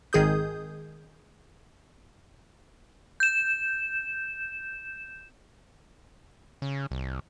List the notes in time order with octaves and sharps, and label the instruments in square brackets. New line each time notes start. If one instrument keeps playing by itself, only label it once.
[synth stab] G#1 D#3 G#4 D#6 G6
[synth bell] G6 E7
[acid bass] C#3
C2